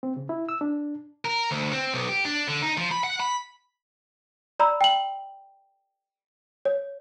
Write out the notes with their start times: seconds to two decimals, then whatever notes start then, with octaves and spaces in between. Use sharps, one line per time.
0.03 C4
0.16 C#3
0.29 E4
0.49 E6
0.61 D4
1.25 A#4
1.51 D2
1.73 C4
1.93 B1
2.09 G4
2.25 D4
2.48 D3
2.62 D#4
2.77 F3
2.91 B5
3.04 F#5
3.20 B5
4.59 D5 A#5 B5 E6
4.81 G5 F#7
6.65 C#5